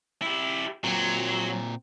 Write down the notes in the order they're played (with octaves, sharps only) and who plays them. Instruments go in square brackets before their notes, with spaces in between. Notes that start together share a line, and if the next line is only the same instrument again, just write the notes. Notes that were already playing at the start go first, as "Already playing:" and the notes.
[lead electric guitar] E4 G4
[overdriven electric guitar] A#2 C4 [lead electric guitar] F#3